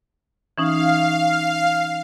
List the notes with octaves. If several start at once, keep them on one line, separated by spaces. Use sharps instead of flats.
E3 C#4 D#4 F5